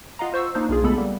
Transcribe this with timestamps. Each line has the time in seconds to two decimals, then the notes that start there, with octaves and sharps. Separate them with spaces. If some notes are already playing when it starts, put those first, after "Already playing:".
0.19 F4 D#5 F5 F#5 A#5
0.32 F4 C5 C#6 E6
0.55 A#3 D4 D#4 C5
0.69 B1 F4 G#4
0.82 D2 C#3 G#3 B3 A4 B5
0.98 G3 A#3